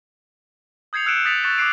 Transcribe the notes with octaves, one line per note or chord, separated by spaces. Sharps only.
D#6 G6 G#6 C7 C#7 F7
E6 F#6 G#6 C#7 D7 E7
D#6 A6 B6 C#7 F7
C#6 F#6 A6 E7
D6 D#6 F#6 C7 D7